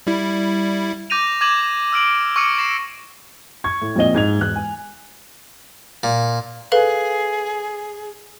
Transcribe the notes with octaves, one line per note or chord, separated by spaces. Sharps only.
G3 E4
D6 G6 A#6 D#7 F7
D6 G#6 D#7 E7 F#7
G#6
E6 F6 D7 F#7
C#6 D6 E6 F6 C#7 D#7
C#6 A#6 C7 D7 E7
C#6 G#6
A2
A#1 A#2 C4 D#5 G7
G#2 G#6 F7
E1 F#6
G#5
A#2
G#4 A4 B4 F5